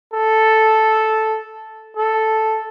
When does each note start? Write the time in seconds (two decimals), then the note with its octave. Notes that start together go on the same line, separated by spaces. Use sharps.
0.13 A4
1.97 A4